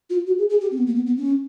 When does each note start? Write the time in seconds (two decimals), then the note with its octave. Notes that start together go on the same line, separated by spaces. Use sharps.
0.10 F4
0.27 F#4
0.38 G#4
0.50 G#4
0.61 G4
0.71 C4
0.78 B3
0.87 A#3
0.95 B3
1.06 B3
1.17 C#4